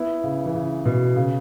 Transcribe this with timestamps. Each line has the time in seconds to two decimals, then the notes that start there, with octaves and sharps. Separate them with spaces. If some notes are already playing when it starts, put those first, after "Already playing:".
Already playing: B3 E4
0.24 C#3
0.46 E3
0.54 C#3
0.85 B2
1.16 C#3